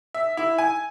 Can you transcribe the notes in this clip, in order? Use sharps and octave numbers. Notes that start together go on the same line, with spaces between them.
E5
E4
G#5